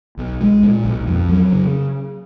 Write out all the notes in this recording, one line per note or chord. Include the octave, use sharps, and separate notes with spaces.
B1
G#3
A#2
B1
F2
F#3
C#3